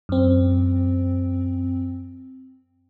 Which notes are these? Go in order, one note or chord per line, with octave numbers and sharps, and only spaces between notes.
F#2 C4